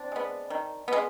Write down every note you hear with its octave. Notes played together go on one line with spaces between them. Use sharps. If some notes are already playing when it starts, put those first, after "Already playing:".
Already playing: C4 D4
G#3 B3
D#3
G#3 B3